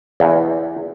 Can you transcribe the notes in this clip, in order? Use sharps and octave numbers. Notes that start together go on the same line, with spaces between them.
E2